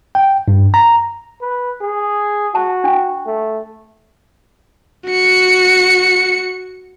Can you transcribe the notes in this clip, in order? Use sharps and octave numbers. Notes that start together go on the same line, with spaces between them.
G5
G2
A#5
B4
G#4
F#4 A5
D4 G5
A3
F#4 C#7